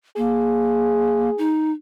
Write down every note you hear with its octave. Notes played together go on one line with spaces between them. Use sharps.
A#3 G#4
D#4